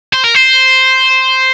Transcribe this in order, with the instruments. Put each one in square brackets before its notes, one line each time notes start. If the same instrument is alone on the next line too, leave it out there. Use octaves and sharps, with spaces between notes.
[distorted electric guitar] C5
A#4
C5